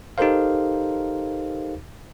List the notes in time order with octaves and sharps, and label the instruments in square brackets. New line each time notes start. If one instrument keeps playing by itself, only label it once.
[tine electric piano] D#4 G4 A4 A#4 C5 F5